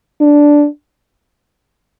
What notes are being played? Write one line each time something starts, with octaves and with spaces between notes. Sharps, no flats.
D4